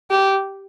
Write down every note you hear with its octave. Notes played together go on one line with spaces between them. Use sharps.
G4